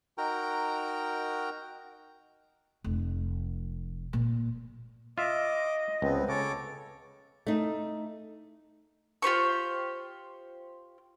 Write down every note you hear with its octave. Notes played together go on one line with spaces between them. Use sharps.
D#4 F#4 A#4 G5 A#5
F1
A#2
F4 D#5 E5 D6
C#2 B3 C4
C#3 A4 C#5 D6
A3 D#4
F4 G4 C5 C#6